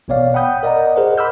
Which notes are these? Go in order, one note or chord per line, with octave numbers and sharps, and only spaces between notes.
A1 B2 B3 C#5 D5 F5
F#5 G5 B5 D#6 G6
A#4 D5 D#5 F#5 A#5
G#4 A#4 C5 D#5 F#5
B5 C6 D6 E6 F6 G6